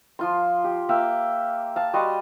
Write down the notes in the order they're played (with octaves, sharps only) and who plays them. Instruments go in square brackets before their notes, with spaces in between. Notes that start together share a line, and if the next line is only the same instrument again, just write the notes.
[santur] F3 F4 C6
G4
A#3 E5 F5 G5
F5 A5
G3 F#4 D#5 C6